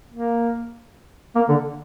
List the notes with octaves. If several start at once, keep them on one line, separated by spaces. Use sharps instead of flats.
A#3
A#3
D3